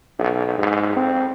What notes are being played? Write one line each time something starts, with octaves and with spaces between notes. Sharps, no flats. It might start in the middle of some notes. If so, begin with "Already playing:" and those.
B1
G#2
C4